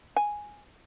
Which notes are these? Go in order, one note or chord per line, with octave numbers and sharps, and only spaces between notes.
G#5